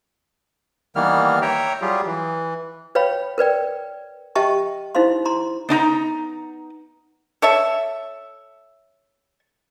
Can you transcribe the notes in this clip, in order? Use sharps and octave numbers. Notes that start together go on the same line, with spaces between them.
D#3 E3 G3 A#3 B3 F6
C#5 E5 G5 A#5
F#3 G3 F4 G4 G#4
E3
B4 C#5 F5 G5 B5
A#4 B4 D5 G5
G4 D#5 E5 G5 A5 C#6
D#4 E4 C5 F5 C6
A#5 C6
B3 D4 D#4 A#5
A4 C#5 E5